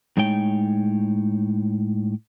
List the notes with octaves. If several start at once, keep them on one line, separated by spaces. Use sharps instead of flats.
A2 G#3 D#4 C#5 G5